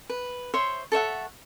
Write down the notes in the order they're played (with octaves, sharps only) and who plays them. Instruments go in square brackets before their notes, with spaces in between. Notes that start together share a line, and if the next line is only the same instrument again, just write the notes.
[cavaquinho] B4
C5 C#5 E5 C6
A4 C#5 E5 F#5